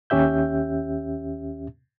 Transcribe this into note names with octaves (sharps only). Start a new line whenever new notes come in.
D#2 C#4 G4 E5 G6